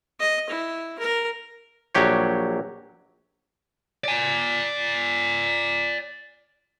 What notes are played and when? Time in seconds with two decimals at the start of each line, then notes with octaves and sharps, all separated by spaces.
0.20 D#5
0.49 E4
0.99 A#4
1.95 A#1 F#3 G4 C#5
4.04 D5 G#5